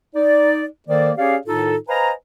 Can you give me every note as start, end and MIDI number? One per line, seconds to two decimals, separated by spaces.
0.15 0.64 63
0.15 0.64 74
0.88 1.12 51
0.88 1.12 58
0.88 1.12 69
0.88 1.12 72
0.88 1.12 74
1.17 1.36 61
1.17 1.36 67
1.17 1.36 68
1.17 1.36 73
1.17 1.36 74
1.17 1.36 77
1.46 1.76 45
1.46 1.76 51
1.46 1.76 63
1.46 1.76 65
1.46 1.76 69
1.88 2.11 71
1.88 2.11 72
1.88 2.11 75
1.88 2.11 77
1.88 2.11 80
1.88 2.11 82